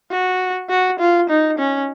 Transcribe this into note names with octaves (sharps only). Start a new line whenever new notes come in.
F#4
F#4
F4
D#4
C#4